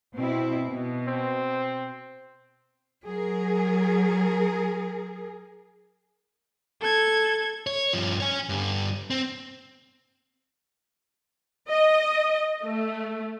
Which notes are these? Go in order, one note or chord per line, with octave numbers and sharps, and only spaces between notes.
B2 C4 E4
B2
C4
F#3 G#4 A#4
A4 G#6
C#5
G2 F3
C#5 G#5
G2 D3
C4
D#5
A3